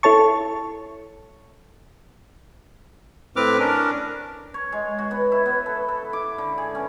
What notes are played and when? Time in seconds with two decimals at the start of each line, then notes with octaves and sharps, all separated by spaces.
0.03 E4 A4 C#5 A5 C#6
3.36 A2 C4 B4 D6 F6
3.59 C#4 D4 A#4
4.54 C#5
4.72 G#3
4.98 F#4
5.11 B3
5.32 E4
5.45 B3
5.66 A4
5.88 A4
6.13 D6
6.38 D3
6.58 G#4
6.75 C#4